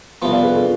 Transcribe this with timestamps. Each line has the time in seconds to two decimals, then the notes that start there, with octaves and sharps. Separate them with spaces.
0.22 C2 C3 F3 B3
0.33 D5 F5
0.43 G#4 B4
0.54 F4 A4